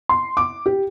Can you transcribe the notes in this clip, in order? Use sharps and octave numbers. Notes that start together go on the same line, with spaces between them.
C6
D6
G4